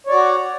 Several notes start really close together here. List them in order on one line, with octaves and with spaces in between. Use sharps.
C#5 D5 F#4